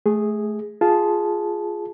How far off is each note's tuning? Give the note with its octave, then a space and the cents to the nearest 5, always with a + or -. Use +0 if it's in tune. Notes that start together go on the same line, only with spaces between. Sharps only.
A3 -25 G#4 -5
F4 +0 G#4 +0 A5 -15